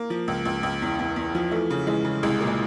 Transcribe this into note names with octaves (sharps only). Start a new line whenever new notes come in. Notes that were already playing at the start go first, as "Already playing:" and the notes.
Already playing: A#3
F3
C#2
C#2
C#2
E2
E2
E2
F3
E3 A3
C#3
E3 G#3
C#3
C2 G#3
A#2
G#3